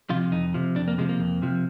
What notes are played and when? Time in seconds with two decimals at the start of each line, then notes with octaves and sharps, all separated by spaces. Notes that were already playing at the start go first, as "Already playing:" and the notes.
0.10 C3 F3 F4
0.32 F2 D#4
0.54 C3 F3
0.76 F2 D4
0.88 A#3
0.98 C3 F3 G#3
1.09 A#3
1.20 F2
1.42 C3 F3